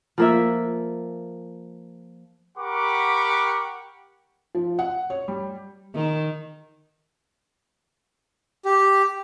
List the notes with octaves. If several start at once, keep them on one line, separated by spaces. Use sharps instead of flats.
F3 A#3 E5
G4 A#4 F#5 B5 C#6 D6
F3
F#5
C#5
G3
D#3
G4